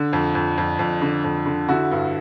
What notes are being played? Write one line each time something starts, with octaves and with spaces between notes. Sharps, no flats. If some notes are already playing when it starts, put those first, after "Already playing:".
Already playing: D3
F2
F2
F2
F2
D3
F2
D3
D3 E4 F#4
G2